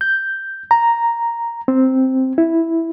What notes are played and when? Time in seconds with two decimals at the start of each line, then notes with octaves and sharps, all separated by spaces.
0.01 G6
0.71 A#5
1.68 C4
2.38 E4